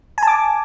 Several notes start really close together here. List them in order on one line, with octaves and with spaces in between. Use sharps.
G#5 A5 D6